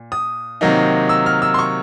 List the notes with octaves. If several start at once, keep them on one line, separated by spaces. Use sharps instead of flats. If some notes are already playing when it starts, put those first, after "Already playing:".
Already playing: A#2
D#6
C3 D#3 F#3 A#3 D#4
E6
F6
E6
C6
C#6